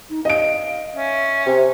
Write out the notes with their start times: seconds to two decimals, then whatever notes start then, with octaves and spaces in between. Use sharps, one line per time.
0.10 D#4
0.25 D#5 F5 D7
0.94 C#4 E5
1.46 C3 G#5